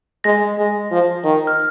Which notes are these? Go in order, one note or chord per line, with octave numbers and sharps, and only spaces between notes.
G#3 A#6
G#3
F3
D#3
F6